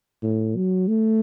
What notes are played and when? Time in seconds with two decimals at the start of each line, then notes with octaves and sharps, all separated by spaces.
0.23 A2
0.56 F#3
0.88 A3